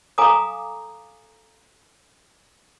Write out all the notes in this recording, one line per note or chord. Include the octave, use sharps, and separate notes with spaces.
A4 F5 G#5 A#5 D6 D#6